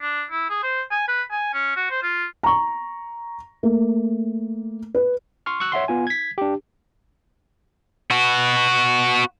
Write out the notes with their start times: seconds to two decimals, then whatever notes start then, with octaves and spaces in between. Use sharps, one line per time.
0.02 D4
0.31 E4
0.50 G#4
0.63 C5
0.91 G#5
1.08 B4
1.32 G#5
1.53 C#4
1.76 F#4
1.90 C5
2.03 F4
2.43 A#5 C#6
3.63 A3 A#3
4.94 B4
5.46 C6 C#6 F6
5.60 C#6 E6 F#6
5.72 C#5 E5 F#5 C6
5.88 B3 F4 G#5
6.07 G#6 B6
6.38 D4 G4
8.11 B3 F#4